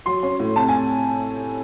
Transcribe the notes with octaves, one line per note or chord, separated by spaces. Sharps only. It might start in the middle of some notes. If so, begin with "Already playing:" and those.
F#3 C6
C#4
A2
C3 A5
G#5